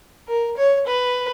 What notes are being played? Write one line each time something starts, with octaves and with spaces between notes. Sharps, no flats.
A#4
C#5
B4